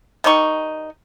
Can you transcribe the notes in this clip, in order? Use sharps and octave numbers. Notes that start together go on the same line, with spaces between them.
D#3 G3 D#4 C#6